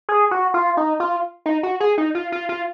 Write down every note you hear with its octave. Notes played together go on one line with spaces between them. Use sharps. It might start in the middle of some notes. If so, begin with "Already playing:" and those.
G#4
F#4
F4
D#4
F4
D#4
F#4
G#4
D#4
F4
F4
F4